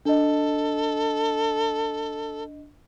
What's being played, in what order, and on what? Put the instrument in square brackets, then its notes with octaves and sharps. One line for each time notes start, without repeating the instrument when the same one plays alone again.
[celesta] D4 D#5 [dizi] A4